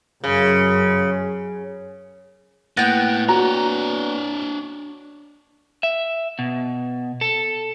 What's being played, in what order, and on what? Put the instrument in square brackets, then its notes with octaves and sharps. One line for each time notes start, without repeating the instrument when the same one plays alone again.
[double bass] F#2 [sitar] C#3
[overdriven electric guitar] A2 [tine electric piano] A#3 F#6 A#6 [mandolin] B3 G5
[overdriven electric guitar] D4 C#5 [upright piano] F#4 A#5
[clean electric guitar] E5
B2
A4